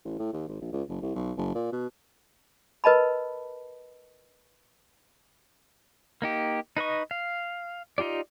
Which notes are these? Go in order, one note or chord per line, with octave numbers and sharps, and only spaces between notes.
A1
A2
D#2
G#1
A#1
C#2
F#1
C2
B1
F#1
A#2
B2
A#4 B4 D#5 A5 B5
A#3 D#4 G4
D#4 B4 D#5 C#6
F5
D#4 F4 G4 D5